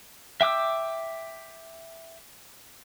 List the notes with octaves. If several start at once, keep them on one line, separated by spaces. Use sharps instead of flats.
E5 G5 D6 E6